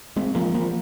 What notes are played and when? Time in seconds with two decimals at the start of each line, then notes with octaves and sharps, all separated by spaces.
0.16 G#3 C4
0.35 F3 A#3
0.54 F3 A#3